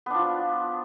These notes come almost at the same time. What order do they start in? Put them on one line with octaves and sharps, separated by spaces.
B3 D4 F3